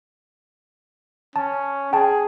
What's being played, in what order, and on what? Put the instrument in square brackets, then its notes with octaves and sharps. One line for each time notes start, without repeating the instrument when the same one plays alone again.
[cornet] C#4 [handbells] A5
[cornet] G#4 [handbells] G5 A5